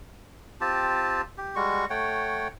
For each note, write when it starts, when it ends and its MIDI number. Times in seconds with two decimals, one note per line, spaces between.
0.61 1.22 60
0.61 1.22 65
0.61 1.22 67
0.61 1.22 81
1.38 1.55 67
1.56 1.85 55
1.56 1.85 56
1.56 1.85 66
1.56 1.85 85
1.90 2.48 57
1.90 2.48 73
1.90 2.48 78
1.90 2.48 79